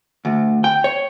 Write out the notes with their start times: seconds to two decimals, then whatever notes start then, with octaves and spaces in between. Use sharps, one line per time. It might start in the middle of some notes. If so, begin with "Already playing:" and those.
0.25 D2
0.64 G5
0.84 C#5